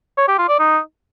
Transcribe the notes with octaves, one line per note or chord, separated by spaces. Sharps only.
C#5
G4
F4
D5
D#4